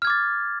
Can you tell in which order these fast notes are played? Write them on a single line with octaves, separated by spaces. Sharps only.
F6 G#6 D6 A6